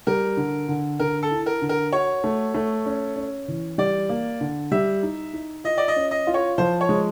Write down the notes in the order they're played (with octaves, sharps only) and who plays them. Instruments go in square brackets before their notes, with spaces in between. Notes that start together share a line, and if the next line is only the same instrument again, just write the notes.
[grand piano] G3 [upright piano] A#4
[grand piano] D3
D3
[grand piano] D3 [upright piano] A#4
[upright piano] A4
[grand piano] E4
[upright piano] A#4
[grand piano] D3
[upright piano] A#4
[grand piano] F#4 [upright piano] C#5
[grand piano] A3
A3
C#4
C#4
E3
[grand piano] G3 [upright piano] D5
[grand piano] A#3
D3
[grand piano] G3 [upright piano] E5
[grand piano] D#4
D#4
[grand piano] F4 [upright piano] D#5
[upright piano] D5
D#5
[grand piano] C#4
[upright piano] D#5
[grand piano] F4
[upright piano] C#5
[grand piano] F3 [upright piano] C5
[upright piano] C#5
[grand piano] G#3